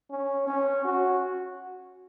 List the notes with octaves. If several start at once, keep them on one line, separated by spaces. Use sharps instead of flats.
C#4
C#4
F#4